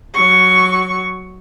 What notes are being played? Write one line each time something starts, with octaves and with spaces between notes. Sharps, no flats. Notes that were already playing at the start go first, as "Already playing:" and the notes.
F#3 C#6